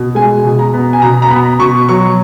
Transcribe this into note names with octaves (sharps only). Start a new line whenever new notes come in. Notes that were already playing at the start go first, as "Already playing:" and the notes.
Already playing: B2
G#3 G#5
B2
A#5
B3
G#5
B2 A#5
A#5
B3 B5
B2 C#6
F#3 C#6